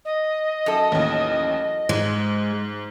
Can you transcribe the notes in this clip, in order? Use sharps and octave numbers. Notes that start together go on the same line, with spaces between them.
D#5
F#2 A4
A1 D#2
G#2 G#3